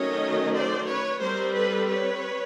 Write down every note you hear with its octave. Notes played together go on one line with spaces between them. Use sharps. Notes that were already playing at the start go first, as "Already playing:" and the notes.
Already playing: D#3 F#3 A3 C#4 C#5 D#5
C5 D5
B4 C#5
G3 C4 A#4 C5
A4 B4
B4 C#5